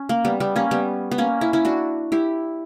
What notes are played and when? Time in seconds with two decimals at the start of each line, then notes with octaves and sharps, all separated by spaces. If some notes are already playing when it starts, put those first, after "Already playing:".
Already playing: C#4
0.09 A#3
0.25 G3 B3
0.40 G3 B3
0.56 A#3 C#4
0.71 G3 B3
1.11 B3
1.18 A#3 C#4
1.41 C#4 E4
1.53 C#4 E4
1.65 D4 F#4
2.12 E4 G4